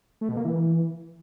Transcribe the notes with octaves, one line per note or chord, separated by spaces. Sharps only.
A3
B2
A#3
E3